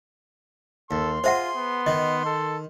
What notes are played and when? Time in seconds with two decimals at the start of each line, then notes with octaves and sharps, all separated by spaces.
0.91 D#2 A4 C6
1.24 F4 G#4 C5 E5 F#5
1.57 B3
1.87 D#3 D#5
2.26 A4